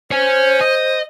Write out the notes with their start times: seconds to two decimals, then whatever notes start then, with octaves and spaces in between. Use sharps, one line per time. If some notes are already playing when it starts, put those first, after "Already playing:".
0.11 C5 C#5 G#5
0.61 D#5